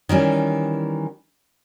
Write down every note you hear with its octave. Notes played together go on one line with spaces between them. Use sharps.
D#3 E3 G3 C#4